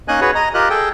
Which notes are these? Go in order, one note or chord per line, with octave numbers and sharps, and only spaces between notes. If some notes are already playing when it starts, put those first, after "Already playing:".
A#3 C#4 D#4 D#5 G#5 F#6
F#4 G#4 B4 C#5
D#5 A#5
F4 G4 A#4 D#5 F#6
G#4 A4 G5